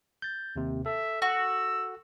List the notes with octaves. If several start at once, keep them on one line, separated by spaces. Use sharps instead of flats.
G6 A6
D#2 C3
A4 E5
F#4 E6